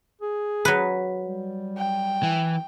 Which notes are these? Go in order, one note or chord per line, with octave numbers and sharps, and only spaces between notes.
G#4
F#3 B4
G3
G5
E3